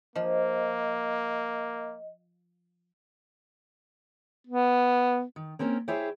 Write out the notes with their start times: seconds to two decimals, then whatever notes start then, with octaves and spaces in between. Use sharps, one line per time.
0.16 F3 A#3 D#5
4.47 B3
5.36 D#3
5.59 A#3 C4 C#4 A#4
5.88 E4 G4 G#4 C5 C#5 E5